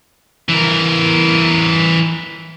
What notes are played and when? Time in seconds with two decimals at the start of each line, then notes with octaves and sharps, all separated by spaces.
0.49 E3 A#4